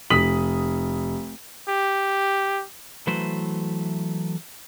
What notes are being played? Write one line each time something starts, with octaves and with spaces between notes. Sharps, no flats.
F1 D#6 B6 F#7
G4
E3 F#3 A3 B4 C5